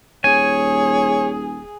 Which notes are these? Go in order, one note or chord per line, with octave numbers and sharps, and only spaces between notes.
D#1 G#4 C#5 G#5